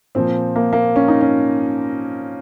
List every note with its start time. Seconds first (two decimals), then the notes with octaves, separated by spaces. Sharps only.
0.15 A#2 F3 C4
0.56 A#3
0.73 A#3
0.96 C#4
1.08 D#4
1.21 C#4